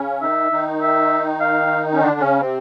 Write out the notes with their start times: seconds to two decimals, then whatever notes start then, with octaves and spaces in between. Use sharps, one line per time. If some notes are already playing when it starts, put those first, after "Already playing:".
Already playing: C#3 C#4
0.21 D#3 D#4 E5
0.51 D#3 D#4
0.81 E5
1.41 F5
1.92 C#4
2.01 D3 D4
2.20 C#3 C#4
2.40 C3 C4